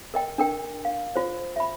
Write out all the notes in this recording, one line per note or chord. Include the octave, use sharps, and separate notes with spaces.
A#4 D#5 G5
D4 A#4 G5
F5
F4 C5
E5 B5